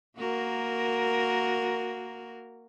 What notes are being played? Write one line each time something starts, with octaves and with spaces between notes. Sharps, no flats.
A#3 F#4 A#4